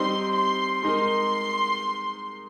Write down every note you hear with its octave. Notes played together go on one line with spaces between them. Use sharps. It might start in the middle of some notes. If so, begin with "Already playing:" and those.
Already playing: G3 C4 D#4 C6
C6
G#3 D#4 A#4 C6